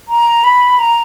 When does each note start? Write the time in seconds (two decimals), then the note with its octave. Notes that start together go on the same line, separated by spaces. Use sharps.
0.08 A#5
0.44 B5
0.79 A#5